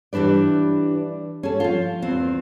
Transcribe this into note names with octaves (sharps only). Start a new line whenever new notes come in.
E3 G3 D4 B4 D5
C#4 G#4 A4
F3 F4
E2 C4